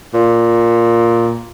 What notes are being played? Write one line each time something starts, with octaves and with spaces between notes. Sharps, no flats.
A#2